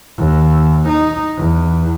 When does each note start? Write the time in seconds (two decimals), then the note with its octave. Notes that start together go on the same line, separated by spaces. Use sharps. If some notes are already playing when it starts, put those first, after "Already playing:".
0.18 D#2
0.88 D#4
1.37 E2